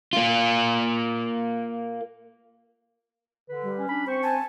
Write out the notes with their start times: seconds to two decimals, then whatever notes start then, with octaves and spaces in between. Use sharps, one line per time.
0.13 A#3 F4
3.49 D3 B4
3.63 G3
3.77 C#4
3.89 D4 B5
4.07 C4 C5 C#6
4.23 G#5 A5